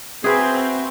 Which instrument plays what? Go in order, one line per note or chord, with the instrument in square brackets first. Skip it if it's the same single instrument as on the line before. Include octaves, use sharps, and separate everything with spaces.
[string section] C4 [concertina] F#4 E5 C6 [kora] G#4 B4